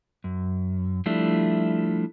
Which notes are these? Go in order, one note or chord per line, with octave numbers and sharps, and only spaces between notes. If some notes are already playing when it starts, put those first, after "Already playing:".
F#2
F3 G3 A3 D4 E4